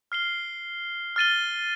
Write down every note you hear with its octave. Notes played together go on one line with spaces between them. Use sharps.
F6 C7 G7
F6 A6 D#7 G7